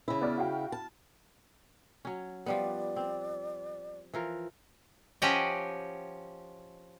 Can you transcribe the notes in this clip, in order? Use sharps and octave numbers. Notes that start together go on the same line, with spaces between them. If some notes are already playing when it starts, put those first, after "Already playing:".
C#3 C#4 E4
B3 D5 F6
F#4 F5 G5
A5
F#3 C#4
F3 G3 B3 D5
C4
E3 F3 A#4
F3 C#4 G4 D#5 F#5 G5